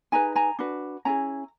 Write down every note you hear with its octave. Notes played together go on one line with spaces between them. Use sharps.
D#4 G#4 B4 G#5 A#5
G#5 A#5
D4 F#4 B4
C#4 E4 G#4 G#5 A#5